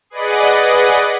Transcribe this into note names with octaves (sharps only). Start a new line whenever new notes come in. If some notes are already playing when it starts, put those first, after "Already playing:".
G#4 B4 D5 D#5 F#5